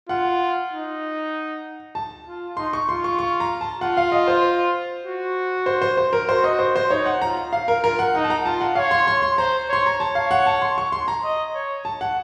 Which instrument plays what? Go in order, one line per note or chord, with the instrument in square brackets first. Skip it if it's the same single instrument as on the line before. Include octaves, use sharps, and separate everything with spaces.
[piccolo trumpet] F4 [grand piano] F#5
[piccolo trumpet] D#4
[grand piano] A5
[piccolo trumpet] F4
[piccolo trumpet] D#4 [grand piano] C6
[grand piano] C#6
[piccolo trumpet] F4 [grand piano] C6
[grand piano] C#6
C#6
A#5
A5
[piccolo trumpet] F4 [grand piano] F#5
[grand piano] F5
D#5
C5
[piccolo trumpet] F#4
[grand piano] C5
C5
C5
A#4
[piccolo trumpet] F#4 [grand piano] C5
[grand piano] D#5
C5
C5
[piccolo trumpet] D#4 [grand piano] C#5
[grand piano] F#5
[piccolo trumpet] F4 [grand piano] A#5
[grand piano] F5
A#4
[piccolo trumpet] F4 [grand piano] A#4
[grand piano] F#5
[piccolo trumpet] D#4 [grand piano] F#5
[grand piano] A5
A#5
[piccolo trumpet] F4 [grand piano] A5
[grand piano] F#5
[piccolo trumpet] C#5 [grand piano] F5
[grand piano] C6
C6
C6
[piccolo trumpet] C5 [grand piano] A#5
[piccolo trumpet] C#5 [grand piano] C6
[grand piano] A#5
[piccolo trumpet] C#5 [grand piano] A5
[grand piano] F5
F#5
A5
C6
C#6
C6
A#5
[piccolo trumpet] D#5
C#5
[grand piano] A5
F#5